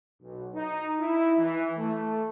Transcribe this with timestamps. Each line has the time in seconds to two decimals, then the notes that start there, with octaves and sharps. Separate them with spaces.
0.22 B1
0.54 D#4
0.99 E4
1.38 E3
1.77 A3